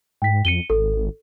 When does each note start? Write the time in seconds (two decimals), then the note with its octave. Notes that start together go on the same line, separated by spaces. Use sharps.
0.22 G#2 G5 B6
0.45 F2 C#7 D#7 G7
0.70 G#1 A4